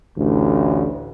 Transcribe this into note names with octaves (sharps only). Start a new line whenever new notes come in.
A1 D2